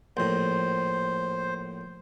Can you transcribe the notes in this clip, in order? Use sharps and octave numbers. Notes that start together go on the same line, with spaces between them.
A#1 A2 C5